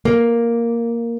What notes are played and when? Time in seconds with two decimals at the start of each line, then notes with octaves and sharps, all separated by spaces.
0.05 A#3